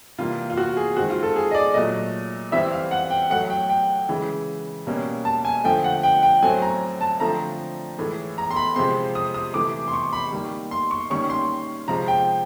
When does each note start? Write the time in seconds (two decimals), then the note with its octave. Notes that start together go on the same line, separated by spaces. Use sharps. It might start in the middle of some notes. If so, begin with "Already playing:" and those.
0.18 C3 E3 G3 A#3 F4
0.50 F4
0.57 F#4
0.77 G#4
0.97 D#3 G#3 C4 F#4
1.10 F4
1.23 A4
1.36 G#4
1.51 D#5
1.54 D5
1.74 A#2 F#3 A3 D#5
2.52 E3 G3 C4 E5
2.72 F5
2.91 F#5
3.10 G5
3.30 A2 F#3 A3 F#5
3.50 G5
3.69 G5
4.09 C#3 E3 G#3
4.87 B2 G3 A#3 C#4
5.25 A5
5.45 G#5
5.64 D3 F3 A3 G5
5.84 F#5
6.03 G5
6.23 G5
6.42 A2 F#3 A3 C4 G#5
6.62 A#5
7.01 A5
7.20 D3 F3 A3 C4 A#5
7.98 A2 E3 G#3
8.38 A#5
8.51 C6
8.56 B5
8.76 C3 F3 G#3 C4 C6
9.15 D#6
9.34 D#6
9.54 C3 E3 A3 D6
9.88 C6
9.93 C#6
10.13 B5
10.32 D#3 G3 A#3
10.71 C6
10.91 C#6
11.10 D#3 G3 A#3 C#4 C#6
11.30 C6
11.88 C3 F3 G#3 A#5
12.08 G5